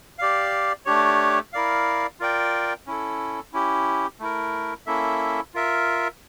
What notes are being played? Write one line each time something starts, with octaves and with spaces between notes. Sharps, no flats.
G4 D5 F5
A3 D4 G4 C#5
E4 A#4 D5 F5
F4 A#4 D5 G5
C#4 E4 A4
C#4 E4 G4
A3 E4 A#4
A#3 C#4 E4 A4 E5
F4 A#4 E5